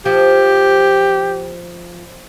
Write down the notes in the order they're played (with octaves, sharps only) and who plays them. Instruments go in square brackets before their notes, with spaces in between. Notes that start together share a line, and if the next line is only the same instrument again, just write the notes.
[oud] F3 [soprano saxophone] G4